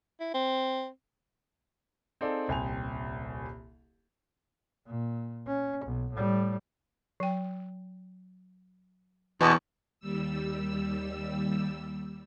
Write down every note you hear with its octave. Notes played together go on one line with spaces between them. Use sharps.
E4
C4
C4 D#4 G#4 A4 D5 F5
D#1 C2 G5 G#5 C6 F7
A#2
C#4
B1
A2 G3
F#3 G5
E2 B2 E3
D#2 G3 E6